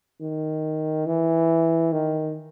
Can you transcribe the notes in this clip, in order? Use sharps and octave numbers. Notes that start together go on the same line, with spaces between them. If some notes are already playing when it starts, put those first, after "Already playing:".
D#3
E3
D#3